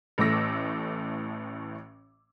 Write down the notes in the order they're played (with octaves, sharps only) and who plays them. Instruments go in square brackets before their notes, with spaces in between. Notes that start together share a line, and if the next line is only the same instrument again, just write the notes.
[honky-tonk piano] A1 A2 A3 D6 E6 A#6